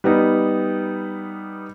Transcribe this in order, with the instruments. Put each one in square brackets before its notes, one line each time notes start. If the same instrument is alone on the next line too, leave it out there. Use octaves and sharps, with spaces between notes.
[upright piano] G3 B3 D#4